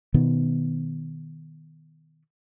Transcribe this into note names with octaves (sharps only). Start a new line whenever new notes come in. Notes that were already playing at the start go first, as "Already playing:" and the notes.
B2 D#3 B3